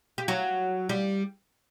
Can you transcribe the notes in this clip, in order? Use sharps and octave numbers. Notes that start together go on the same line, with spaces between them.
G4
F#3 F#4
G3 G4